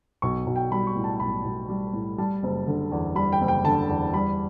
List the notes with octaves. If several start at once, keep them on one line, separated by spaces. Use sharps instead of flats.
B1 C#6
B1
G5
G3 B5
C#6
A2
A5
B1 B5
B1
G3
A2
G3 A5
F#1
D3
E2
G3 B5
G5
F#1
G5
D3 A5
E2
G3 B5